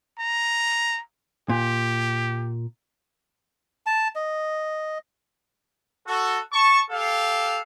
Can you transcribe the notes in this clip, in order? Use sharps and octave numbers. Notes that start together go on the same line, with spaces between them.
A#5
A#2 G4
A5
D#5
F#4 A4
A5 C#6
G4 A4 F5